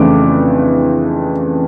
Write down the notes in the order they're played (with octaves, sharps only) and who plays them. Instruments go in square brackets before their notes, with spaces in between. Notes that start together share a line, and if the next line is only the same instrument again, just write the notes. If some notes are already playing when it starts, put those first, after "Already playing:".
Already playing: [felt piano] F2 C#3 E3 A3 D4 D6